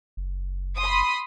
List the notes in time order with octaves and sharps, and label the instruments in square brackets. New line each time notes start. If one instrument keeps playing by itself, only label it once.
[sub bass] F#1
[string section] B5 C6 D#6